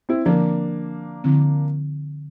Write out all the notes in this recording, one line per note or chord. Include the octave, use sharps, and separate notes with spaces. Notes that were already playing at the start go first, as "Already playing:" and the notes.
C4 E4
D3 F3 A#3 C4 D4
D3 F3 C4 E4